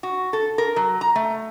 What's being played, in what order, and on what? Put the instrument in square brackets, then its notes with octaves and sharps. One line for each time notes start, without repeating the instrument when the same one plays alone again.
[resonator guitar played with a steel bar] F#4
A4
A#4
F#3
A#5
A3